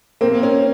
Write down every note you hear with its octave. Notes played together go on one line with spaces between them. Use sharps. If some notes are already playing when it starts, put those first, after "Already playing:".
A#3 C4
C#4